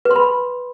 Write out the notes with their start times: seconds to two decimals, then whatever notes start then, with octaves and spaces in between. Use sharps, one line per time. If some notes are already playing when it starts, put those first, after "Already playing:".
0.05 B4
0.11 C6
0.16 B5